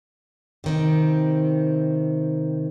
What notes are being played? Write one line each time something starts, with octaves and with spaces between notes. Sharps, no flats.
C3 D#3 C4